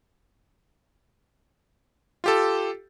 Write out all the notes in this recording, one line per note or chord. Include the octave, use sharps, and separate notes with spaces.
F4 G4 A4